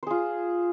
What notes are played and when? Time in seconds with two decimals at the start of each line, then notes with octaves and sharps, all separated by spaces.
0.03 C5
0.07 G#4
0.11 F4